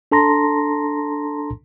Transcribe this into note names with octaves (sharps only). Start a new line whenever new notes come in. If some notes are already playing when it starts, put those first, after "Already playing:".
D4 A4 A5 A#5 C6 A#6